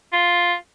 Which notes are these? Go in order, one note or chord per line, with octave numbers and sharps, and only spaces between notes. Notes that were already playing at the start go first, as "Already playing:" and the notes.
F4